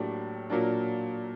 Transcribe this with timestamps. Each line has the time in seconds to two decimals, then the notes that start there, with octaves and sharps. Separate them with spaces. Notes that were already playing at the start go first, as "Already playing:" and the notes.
Already playing: A2 F#3 A#3 D4 G4
0.50 A#2 F#3 A#3 D4